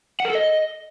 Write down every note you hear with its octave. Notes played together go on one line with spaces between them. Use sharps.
F#5
A#4
A4
D#5